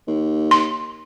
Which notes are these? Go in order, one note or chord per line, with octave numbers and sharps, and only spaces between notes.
D#2
C6